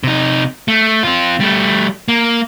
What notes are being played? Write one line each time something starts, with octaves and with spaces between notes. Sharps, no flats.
C3 D#4
A3
C4 F4
G3 A3
A#3